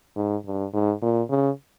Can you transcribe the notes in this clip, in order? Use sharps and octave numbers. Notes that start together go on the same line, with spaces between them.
G#2
G2
G#2
A#2
C#3